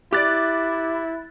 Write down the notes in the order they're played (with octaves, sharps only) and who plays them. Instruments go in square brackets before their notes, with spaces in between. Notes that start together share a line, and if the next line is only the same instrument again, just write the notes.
[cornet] E4 [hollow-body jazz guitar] G4 D5 [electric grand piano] D6 F#6 A6